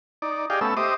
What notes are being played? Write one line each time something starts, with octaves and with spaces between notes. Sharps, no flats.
D#4 D5
G4 G#4 D5 D#5 F5 G5
A3 B3 C#4 A4 E6
G4 C5 D#5 E5 D6 D#6